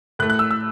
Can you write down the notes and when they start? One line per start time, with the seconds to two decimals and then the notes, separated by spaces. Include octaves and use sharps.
0.19 A2 A3 F#6
0.30 F#6
0.39 E6
0.51 E6